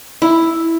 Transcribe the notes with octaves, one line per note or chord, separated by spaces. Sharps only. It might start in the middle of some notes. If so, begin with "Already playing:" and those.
E4